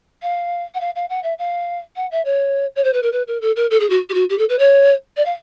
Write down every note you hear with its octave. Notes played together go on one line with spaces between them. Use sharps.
F5
F#5
F5
F5
F#5
E5
F5
F#5
E5
C#5
C#5
C5
B4
A#4
B4
A#4
A4
A#4
A4
G#4
F#4
G4
F#4
G4
A4
B4
C#5
D5
F5